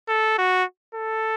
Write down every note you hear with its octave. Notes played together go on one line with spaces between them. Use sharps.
A4
F#4
A4